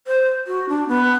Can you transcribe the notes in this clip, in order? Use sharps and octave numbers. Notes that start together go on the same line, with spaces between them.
C5
F#4
D4
B3